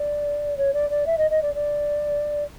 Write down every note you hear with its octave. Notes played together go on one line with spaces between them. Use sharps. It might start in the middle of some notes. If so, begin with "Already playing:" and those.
Already playing: D5
C#5
D5
D5
E5
D#5
D#5
D5
D5